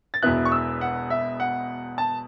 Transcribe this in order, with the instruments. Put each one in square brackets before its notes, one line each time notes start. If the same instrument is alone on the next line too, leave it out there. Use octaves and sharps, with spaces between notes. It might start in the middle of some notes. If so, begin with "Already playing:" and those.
[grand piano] A6
E1 E2 B2 B3 E4 F#6
C#6
E6
F#5
E5
F#5
A5